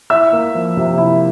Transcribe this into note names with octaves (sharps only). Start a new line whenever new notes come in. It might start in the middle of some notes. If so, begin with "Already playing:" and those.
E4 E5 E6
A#3
F3
C3
E4